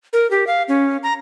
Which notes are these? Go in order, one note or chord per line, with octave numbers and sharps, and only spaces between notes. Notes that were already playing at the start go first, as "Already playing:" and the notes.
A#4
G4
F5
C#4
A#5